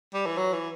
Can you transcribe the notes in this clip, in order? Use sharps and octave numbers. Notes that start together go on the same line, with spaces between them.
G3
E3
F#3
E3